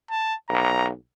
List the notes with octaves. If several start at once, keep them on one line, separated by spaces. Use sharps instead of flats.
A5
B1 A#5